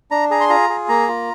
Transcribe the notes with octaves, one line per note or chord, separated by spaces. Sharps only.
D4 A#5
G#4 A#5
C6
F4 A#5
G#4
A#3 A#5
F4